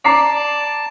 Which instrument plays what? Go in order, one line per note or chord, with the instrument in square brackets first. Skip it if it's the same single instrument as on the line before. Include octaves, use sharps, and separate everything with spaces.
[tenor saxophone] D5 [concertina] A5 [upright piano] A#5 D6 C7